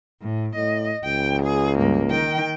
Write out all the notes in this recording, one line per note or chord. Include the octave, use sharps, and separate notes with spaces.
A2
A2 D#5
C#2 G5
G#4
G2 A#3
D#3 G5